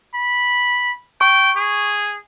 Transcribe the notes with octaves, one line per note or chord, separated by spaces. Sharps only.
B5
G5 C#6
G#4